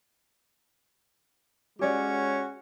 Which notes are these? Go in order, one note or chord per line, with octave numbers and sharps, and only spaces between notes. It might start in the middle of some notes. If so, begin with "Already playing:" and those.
G#3 C#4 F#4 G4 C#5 D5